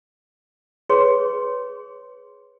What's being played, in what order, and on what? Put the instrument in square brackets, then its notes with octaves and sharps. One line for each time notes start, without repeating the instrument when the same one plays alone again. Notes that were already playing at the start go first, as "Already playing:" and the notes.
[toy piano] G#4 B4 C#5 C6